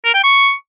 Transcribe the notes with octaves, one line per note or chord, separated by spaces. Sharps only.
A#4
G5
C#6